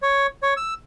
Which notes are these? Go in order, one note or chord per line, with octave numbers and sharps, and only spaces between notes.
C#5
C#5
E6